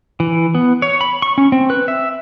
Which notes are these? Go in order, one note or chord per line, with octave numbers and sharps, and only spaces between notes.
E3
B3
C#5
B5
C#6
C#4
C4
B4
E5